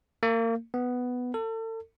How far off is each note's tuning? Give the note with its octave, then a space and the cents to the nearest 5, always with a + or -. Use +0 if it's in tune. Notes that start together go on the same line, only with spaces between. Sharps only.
A#3 -30
B3 +5
A4 +35